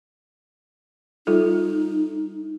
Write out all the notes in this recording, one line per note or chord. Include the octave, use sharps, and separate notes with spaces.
G3 D#4 F4 A4